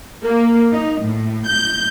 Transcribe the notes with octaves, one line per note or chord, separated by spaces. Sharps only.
A#3
D#4
A2
G6